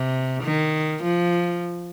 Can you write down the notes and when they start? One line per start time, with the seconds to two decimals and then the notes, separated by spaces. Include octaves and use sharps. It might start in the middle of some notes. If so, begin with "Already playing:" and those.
Already playing: C3
0.43 D#3
1.03 F3